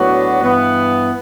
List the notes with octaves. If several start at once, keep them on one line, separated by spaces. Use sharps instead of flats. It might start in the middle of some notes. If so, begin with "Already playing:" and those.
Already playing: A2 F#3 B3 D4 F#4
G2 E3 B3